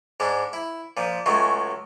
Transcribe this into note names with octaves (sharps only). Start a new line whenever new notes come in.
G#2 G#3 D4
E4
A#2 F3
C#2 F#3 G#3 A3